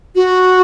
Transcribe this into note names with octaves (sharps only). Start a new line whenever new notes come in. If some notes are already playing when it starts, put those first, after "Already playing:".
F#4